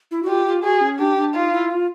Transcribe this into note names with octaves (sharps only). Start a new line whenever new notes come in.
E4
F#4
F4 G4
F4
F#4 G#4
C#4
D4 G4
D4
D#4 F4
E4
F4